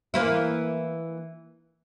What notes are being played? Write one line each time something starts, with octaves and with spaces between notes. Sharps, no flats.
E3 A#3 E4